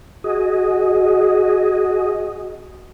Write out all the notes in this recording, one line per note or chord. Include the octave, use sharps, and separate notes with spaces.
F#4 G#4 D#5